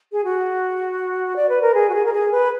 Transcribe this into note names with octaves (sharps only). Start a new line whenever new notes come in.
G#4
F#4
D5
B4
A#4
G#4
F#4
G#4
A#4
G#4
B4